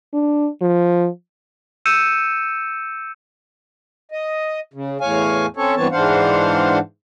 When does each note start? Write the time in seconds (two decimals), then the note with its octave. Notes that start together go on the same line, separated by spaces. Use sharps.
0.14 D4
0.62 F3
1.86 E6 G6 C#7 D#7 E7
4.12 D#5
4.74 C#3
5.01 E2 A2 C#5 F5 G#5
5.57 C4 C#4 A4 C#5
5.77 G2 E3 B3 C4 C#5 A5
5.92 G#2 E3 D4 C5 F5 F#5